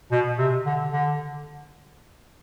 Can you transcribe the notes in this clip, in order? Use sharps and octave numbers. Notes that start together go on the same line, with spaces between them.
B2
C3
D3
D3